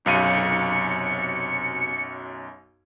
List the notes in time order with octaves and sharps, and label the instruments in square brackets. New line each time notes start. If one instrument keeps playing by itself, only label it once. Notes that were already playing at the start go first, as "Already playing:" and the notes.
[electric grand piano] B1 F#2 D#7 [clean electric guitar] C3 F5 B5 [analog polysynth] C#7